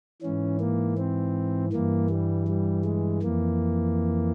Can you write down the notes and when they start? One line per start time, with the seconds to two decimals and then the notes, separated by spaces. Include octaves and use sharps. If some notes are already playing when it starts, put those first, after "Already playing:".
0.22 G#2 E3 C#4
0.60 A#3
0.98 C4
1.73 G2 E3 A#3
2.10 G3
2.48 G3
2.85 G#3
3.22 F2 E3 A#3